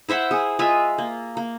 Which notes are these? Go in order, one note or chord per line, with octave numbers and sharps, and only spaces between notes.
E4 C5 E5 F#5
G#4
G#3 F4 E5 G#5
A#3
A#3